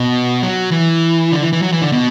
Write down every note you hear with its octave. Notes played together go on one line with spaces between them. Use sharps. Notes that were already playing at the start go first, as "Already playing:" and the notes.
Already playing: B2
F#3
E3
D3
E3
E3
F#3
E3
D3
B2